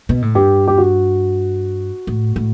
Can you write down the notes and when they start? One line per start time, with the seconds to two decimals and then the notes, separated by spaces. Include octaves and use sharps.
0.09 B2
0.22 A2
0.35 G2 G4
0.68 G4
0.78 F#4
2.07 A2
2.36 A2